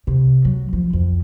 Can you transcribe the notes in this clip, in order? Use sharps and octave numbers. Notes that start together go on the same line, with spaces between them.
C3
F#3
F3
F2